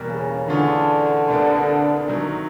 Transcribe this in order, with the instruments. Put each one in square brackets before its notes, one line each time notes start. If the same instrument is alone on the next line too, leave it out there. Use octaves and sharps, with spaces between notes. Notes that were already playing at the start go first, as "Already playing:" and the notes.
Already playing: [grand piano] E2 B2 G3 A#3
[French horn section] C#3
[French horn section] D3 [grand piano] E3 A3 C#4 F4 G#4
[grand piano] C2 A#2 G3 B3 D4
C3 D#3 F#3